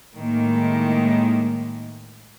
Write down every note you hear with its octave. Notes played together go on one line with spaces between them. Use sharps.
A2 D#3 G#3 A#3